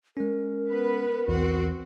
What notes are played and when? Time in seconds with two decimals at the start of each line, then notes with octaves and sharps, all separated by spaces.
0.17 G#3 C#4 A#4
0.70 B3 B4
1.28 B1 E2 E3 C4 F#4